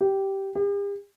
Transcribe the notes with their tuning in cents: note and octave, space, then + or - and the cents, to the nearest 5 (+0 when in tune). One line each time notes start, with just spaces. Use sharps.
G4 -10
G4 +45